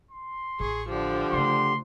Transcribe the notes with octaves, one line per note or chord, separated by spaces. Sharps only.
C6
A1 G#4 C#6
D3 F3 D4 G4
C#3 A3 C6